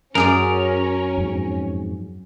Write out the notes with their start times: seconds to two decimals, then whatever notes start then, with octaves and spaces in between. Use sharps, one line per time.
0.15 F#2 C#4 G#4 A#4 D5
1.17 F2 G#2